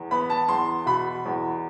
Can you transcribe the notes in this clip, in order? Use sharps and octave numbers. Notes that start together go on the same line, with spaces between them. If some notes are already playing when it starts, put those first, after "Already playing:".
Already playing: E2
B3 B5
A5
E2 C6
B2 B5
E2